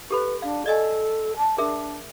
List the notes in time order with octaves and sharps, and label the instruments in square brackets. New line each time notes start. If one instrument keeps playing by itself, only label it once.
[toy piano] G4 A4 B5 [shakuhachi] B4
[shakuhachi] D4 [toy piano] F5
[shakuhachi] A4 [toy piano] D5 D#5 G#5
[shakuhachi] A5
[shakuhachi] D4 [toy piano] G#4 A#4 E5